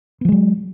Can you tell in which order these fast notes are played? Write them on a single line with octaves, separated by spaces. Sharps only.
B3 F3 G#3 F#3